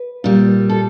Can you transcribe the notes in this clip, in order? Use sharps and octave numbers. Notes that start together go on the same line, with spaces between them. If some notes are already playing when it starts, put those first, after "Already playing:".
Already playing: B4
A#2 G3
A4